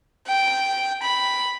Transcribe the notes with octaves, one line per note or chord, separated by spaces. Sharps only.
G5
B5